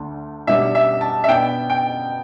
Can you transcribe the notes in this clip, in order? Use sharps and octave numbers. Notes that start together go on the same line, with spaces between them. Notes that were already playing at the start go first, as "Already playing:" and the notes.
Already playing: D2 D3 A3 D4
B2 G3 D4 E5
E5
A5
E5
B2 B3 D4 G5
G5